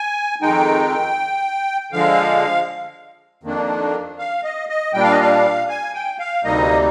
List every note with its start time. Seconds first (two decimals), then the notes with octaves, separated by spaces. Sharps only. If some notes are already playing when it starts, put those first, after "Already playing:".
Already playing: G#5
0.42 F2 D#3 G#3 D#4 G5
1.92 D3 F3 G#3 F5
3.43 F2 D#3 A#3 D4
4.19 F5
4.44 D#5
4.69 D#5
4.93 A#2 G3 D4 G5
5.03 F5
5.11 D#5
5.21 F5
5.69 G#5
5.94 G5
6.19 F5
6.44 D2 C3 G3 A#3 D#4 D#5